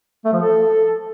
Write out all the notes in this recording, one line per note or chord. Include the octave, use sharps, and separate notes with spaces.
A3
F3
A4